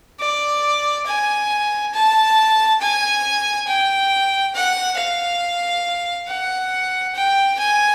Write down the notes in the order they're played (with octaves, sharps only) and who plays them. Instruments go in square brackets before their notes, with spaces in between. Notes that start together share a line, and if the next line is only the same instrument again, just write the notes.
[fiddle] D5
G#5
A5
G#5
G5
F#5
F5
F#5
G5
G#5